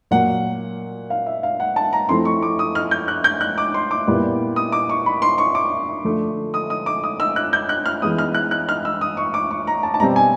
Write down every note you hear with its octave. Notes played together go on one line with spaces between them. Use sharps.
A#2 F#3 A#3 F#5
F5
E5
F5
F#5
A5
A#5
F3 A3 C4 E4 C6
C#6
D6
D#6
F6
G6
F#6
G6
F#6
D6
C6
D6
A#2 G3 B3 E4
D#6
D6
C#6
B5
C6
C#6
D6
D3 F3 A3
D#6
D#6
D6
D#6
E6
F#6
G6
F#6
F6
E3 G#3 B3 D#6
F6
F#6
F#6
F6
E6
D#6
C#6
D6
C#6
A#5
A5
A5
B2 G3 C4 A#5
G#5